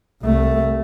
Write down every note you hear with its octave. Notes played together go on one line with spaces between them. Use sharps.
C2 A3